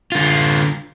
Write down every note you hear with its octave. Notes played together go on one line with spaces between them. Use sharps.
D3 F4